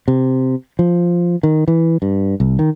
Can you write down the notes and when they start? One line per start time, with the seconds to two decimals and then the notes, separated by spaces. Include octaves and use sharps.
0.08 C3
0.79 F3
1.43 D#3
1.68 E3
2.02 G2
2.40 C2
2.59 D#3